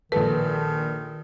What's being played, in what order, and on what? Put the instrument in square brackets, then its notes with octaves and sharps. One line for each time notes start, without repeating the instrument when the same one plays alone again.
[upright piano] A#1 A4 [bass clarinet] D#3 [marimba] B4